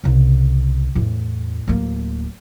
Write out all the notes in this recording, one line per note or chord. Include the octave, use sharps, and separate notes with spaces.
C2 C#3
E2 A2
D1 A#3